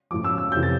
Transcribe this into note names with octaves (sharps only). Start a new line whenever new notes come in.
A2 F3 D6
E6
E6
F2 C3 E3 G6
A6